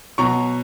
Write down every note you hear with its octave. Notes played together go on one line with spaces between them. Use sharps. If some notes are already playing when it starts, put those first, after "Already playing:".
B2 F#3 A#5 C#6